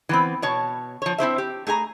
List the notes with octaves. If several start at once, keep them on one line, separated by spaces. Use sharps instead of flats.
E3 B3 C4
B2 C#5 A5
F3 C#5
C4 E4 C5 E5
G4
A3 G#4 G#5 A#5